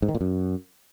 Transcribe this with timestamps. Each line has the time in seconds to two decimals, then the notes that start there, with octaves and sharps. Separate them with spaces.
0.02 G#2
0.09 D#3
0.15 A#2
0.21 F#2